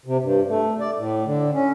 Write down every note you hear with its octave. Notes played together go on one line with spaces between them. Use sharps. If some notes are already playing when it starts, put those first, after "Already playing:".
C3
G2
A3
D5
A2
D3
C#4